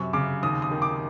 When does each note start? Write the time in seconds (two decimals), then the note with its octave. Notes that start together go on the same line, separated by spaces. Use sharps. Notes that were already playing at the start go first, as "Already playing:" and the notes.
Already playing: F#2 C3 C#6
0.13 C#3 D6
0.43 D#2 D#6
0.62 D#6
0.71 D#3
0.82 D6